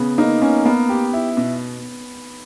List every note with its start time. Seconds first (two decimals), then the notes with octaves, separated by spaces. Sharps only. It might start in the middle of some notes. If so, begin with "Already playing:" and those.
Already playing: C#3 B3
0.18 A#3 D#4
0.42 A#3 C#4
0.65 A#3 B3
0.89 G4
1.13 E4
1.37 B2